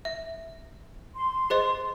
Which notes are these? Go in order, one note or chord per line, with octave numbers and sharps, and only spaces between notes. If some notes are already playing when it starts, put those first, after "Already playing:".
E5
C6
G#4 C5 D#5